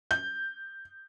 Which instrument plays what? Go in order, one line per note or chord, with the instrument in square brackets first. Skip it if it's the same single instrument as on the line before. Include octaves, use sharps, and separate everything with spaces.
[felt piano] G6